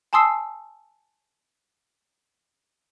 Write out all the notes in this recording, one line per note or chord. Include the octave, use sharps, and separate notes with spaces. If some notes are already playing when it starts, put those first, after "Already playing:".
G#5 A5 C6 D#6 E6 C7